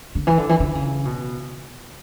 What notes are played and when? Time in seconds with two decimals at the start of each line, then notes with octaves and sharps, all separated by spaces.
0.15 D3
0.27 E3
0.38 D3
0.49 E3
0.60 D3
0.75 C#3
1.05 B2